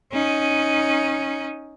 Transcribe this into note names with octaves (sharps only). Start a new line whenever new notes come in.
C#4 D#4